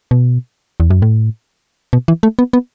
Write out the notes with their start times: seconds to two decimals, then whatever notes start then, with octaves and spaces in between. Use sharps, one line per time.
0.11 B2
0.80 E2
0.90 F#2
1.02 A2
1.93 B2
2.08 E3
2.23 A3
2.39 B3
2.53 B3